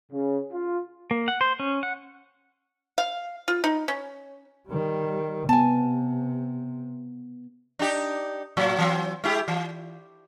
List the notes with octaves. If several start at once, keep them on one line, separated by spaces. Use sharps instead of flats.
C#3
F4
A#3
F#5
C5
C#4
F#5
F5
F4
D#4
C#4
D#3 G3
C3 B3 G#5 A5
D4 D#4 G4
A2 F#3
E3 F#3 C4
G#3 E4 G4
E3